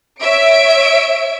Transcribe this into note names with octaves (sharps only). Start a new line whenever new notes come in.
C#5 E5 D7